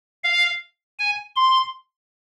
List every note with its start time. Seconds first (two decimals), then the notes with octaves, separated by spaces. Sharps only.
0.24 F5
0.99 G#5
1.36 C6